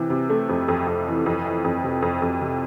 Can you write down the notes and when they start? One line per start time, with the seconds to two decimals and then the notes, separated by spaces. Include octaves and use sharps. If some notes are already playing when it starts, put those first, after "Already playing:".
Already playing: C3 E3
0.10 C3
0.29 A3
0.49 F2
0.68 F2
0.87 F2
1.07 E3
1.26 F2
1.45 E3
1.64 F2
1.83 C3
2.02 F2
2.22 F2
2.41 C3